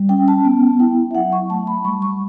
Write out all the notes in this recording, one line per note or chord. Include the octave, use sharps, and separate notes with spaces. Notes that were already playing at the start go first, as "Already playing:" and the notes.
Already playing: G3
C#4 G5
A5
B3
E4 G5
E5
F#3 F#5
C#6
A3 A5
B5
G3 C#6
C#6